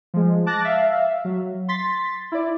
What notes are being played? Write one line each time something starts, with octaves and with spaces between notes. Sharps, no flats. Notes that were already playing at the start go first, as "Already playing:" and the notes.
F3 G#3
A5 D6 F#6 A6 A#6
E5 F5
F#3
C6 A6 B6
E4 D5